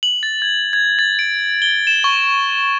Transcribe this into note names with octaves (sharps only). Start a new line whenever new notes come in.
F#7
A6
G#6
G#6
A6
D7
G7
E7
C#6